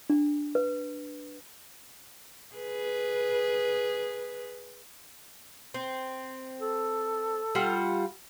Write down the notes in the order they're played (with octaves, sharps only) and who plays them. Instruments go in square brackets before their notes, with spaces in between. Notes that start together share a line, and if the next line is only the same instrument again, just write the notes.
[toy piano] D4
B4
[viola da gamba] G#4 B4
[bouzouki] C4
[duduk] A4
[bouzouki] G3 F4 F#5